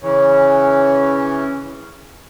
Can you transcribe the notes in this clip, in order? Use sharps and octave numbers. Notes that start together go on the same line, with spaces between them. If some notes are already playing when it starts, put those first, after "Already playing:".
C#3 E3 C#4